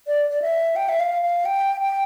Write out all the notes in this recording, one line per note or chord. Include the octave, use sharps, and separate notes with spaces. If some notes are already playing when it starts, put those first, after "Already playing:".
D5
D5
E5
G5
E5
F5
F5
G5
G5